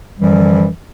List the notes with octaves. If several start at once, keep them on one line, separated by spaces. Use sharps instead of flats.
F#2 D3 E3 F3 G3